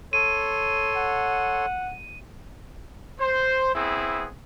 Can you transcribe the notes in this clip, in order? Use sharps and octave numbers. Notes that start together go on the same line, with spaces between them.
A4 C#5 C6 D#7
F#5
C5
B3 C4 E4 G#4